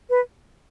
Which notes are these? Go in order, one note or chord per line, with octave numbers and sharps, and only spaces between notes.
B4